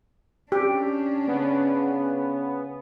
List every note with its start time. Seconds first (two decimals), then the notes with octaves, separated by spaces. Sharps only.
0.52 C#4 D4 G4
1.28 C#3 B3